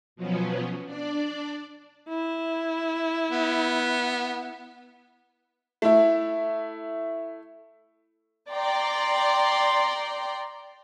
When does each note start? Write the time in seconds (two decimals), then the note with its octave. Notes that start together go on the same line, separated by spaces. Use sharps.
0.16 B2 F3 F#3 B3 C#4
0.85 D4 D5
2.08 E4
3.31 B3
5.82 A3 E4
8.51 D5 G5 A#5 C6